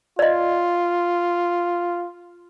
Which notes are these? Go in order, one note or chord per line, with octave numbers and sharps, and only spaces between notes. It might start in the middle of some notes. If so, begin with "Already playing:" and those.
F4 D5 D#5